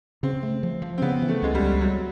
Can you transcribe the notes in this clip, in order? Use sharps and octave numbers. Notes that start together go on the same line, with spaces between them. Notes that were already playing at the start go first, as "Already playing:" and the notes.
C#3 C4
A3
F3
F3
C4
C#3 B3
E3
A3
C#2 G#3
G3
C#2
F#3 G3